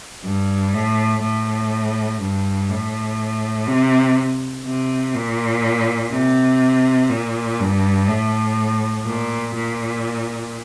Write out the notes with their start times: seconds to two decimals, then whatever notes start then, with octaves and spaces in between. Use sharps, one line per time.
0.25 G2
0.74 A2
1.22 A2
2.21 G2
2.69 A2
3.68 C3
4.66 C3
5.15 A#2
6.12 C3
7.10 A#2
7.59 G2
8.08 A2
9.05 A#2
9.55 A#2